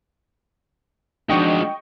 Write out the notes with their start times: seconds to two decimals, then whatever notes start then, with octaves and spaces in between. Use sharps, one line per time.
1.29 F3 G#3 D4 D#4 F#4 D#5 G5 C#6